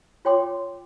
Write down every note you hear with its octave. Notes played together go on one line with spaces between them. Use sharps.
F4 C#5 G5 C6 D6